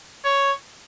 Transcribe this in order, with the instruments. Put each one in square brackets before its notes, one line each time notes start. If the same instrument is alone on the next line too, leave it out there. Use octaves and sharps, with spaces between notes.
[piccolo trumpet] C#5